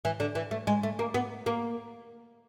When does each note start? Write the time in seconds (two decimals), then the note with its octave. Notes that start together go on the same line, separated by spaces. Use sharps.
0.05 E3
0.20 D3
0.35 E3
0.51 A3
0.67 G#3
0.83 A3
0.99 A#3
1.14 B3
1.46 A#3